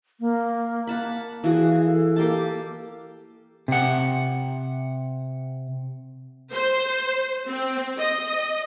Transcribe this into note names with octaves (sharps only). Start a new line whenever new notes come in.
A#3
F#5 A5 B5
E3 F#4 G#4 F5
A4
A#3 G4 A5
C3 F#5
C5
C4
D#5